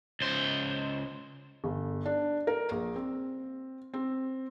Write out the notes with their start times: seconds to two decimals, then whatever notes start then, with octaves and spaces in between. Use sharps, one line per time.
0.21 C#2 C5
1.64 G1
2.06 D4
2.47 A#4
2.71 A#1
2.96 C4
3.94 C4